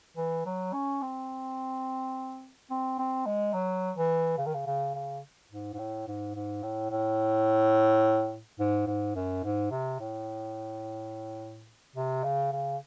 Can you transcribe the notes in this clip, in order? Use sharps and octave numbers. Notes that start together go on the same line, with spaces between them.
E3
F#3
C#4
C4
C4
C4
G#3
F#3
E3
C#3
D#3
C#3
C#3
C#3
G#2
G#2
A2
G#2
G#2
A2
A2
G#2
G#2
F#2
G#2
C3
A2
C3
C#3
C#3